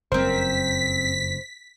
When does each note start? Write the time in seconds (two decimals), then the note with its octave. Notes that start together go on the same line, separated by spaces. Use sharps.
0.12 F#1 F2 C4 A#4 C5 B6